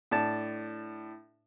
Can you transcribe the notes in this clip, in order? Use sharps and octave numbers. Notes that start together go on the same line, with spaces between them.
A2 D4 A5